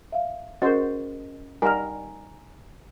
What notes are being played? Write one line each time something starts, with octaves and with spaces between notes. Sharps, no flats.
E5 F5
C#4 F#4 G#4 A#4 C5 D#5
G3 D#4 A#4 D5 F#5 G#5 A#5 F6